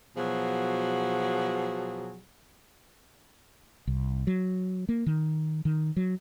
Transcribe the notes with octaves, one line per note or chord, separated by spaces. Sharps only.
B2 F3 F#3 G#4
C2
F#3
A#3
D#3
D#3
F#3